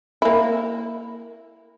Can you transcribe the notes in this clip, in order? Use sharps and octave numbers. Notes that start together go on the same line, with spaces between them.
A#3 E4